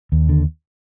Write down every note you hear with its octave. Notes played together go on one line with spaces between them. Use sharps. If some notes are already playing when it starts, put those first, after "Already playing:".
D#2
D3